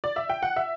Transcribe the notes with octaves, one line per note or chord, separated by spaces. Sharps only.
D5
E5
G5
F#5
E5